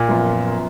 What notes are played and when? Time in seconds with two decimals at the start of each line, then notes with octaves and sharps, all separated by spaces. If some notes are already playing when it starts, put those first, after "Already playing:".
Already playing: A#2
0.08 F#2 F3 B3 F4